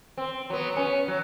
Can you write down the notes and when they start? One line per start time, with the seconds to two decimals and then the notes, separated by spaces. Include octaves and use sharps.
0.18 C4
0.50 F#3 B3
0.75 B3 C#4
1.08 F#3